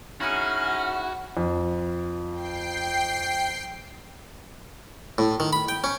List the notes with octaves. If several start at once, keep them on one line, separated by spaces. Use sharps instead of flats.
C#4 D#4 E4 F#4 G#4 F6
F2
G5 C7
A2
D#3
B5
G5
C#4